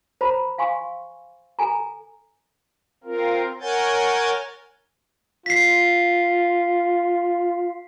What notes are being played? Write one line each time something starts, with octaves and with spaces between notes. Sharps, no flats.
C5 A#5 B5
F5 G#5 C6 C#6
A4 G#5 A#5
C4 F4 A#4
A#4 C#5 F#5 G#5 G6 A6
F4 B6 C7